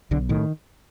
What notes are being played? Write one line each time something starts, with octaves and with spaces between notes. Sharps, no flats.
B1 D3
A2 D#3